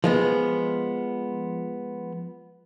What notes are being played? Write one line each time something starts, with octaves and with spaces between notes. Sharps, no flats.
F3 G#3 B3